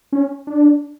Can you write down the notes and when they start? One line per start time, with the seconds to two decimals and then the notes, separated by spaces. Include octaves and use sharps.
0.12 C#4
0.47 D4